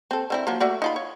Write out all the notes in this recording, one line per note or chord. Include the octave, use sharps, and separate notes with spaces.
C4 A4
D3 C4 E4
F3 F#3 A#3
A3 F#4 D5
D#4 F4 B5
C#5